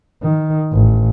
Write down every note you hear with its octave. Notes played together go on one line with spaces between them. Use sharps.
D#3
A1